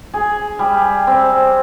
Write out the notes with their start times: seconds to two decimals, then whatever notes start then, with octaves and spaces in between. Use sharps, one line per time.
0.14 G#4
0.59 G3
1.07 C4